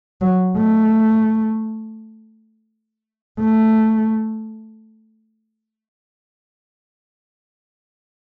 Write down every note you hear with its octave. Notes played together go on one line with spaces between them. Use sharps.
F#3
A3
A3